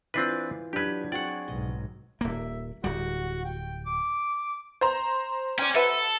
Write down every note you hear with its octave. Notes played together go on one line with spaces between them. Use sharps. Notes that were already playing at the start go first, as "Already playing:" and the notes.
E3 C4 D4 F4 B4
F#3 D4 G4 B4 G#6
C4 F#4 G#4 D5 F#5
B1 G#2 D#5
D#1 A#3 E5
D1 G3 F#4
G5
D6
C5 A#5
C#4 D5 G5
F#4 A4 B4 E5